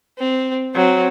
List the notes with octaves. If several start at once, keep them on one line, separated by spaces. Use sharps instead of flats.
C4
F#3 C4